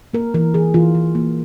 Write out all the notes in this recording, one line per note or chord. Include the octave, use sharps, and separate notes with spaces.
A#3 A#4
E3 A#4
E3 G#4
E3 F4
E3
A#3